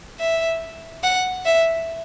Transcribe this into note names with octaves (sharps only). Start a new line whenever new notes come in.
E5
F#5
E5